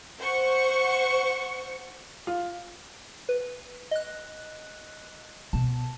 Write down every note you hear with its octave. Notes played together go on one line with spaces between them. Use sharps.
C5 F#5 C#6
F4
B4
D#5 F#6
B2 A5